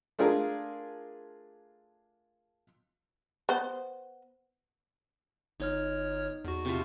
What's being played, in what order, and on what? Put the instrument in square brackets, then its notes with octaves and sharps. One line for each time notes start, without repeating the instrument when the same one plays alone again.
[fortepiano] A3 D4 F4 G#4 A#4
[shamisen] B3 C5
[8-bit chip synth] G1 C#5 F6 [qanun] D#4
[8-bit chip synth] E2 F#4
[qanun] C3 A3 F4